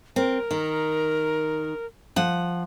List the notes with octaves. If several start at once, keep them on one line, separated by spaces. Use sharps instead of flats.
C4 A#4
D#3
F3 F#5